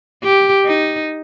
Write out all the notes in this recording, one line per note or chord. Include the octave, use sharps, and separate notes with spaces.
G4
D#4